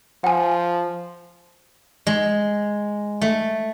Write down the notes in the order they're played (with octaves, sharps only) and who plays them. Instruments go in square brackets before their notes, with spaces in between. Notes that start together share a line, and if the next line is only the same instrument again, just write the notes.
[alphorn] F3 [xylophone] F#5 G#5
[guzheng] G#3
A3